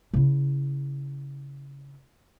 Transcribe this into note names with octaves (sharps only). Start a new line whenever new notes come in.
C#3 E4